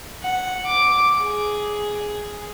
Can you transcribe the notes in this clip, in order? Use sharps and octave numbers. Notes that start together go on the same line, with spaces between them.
F#5
D6
G#4